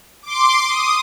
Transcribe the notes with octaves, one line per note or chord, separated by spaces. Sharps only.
C6 D6
D#6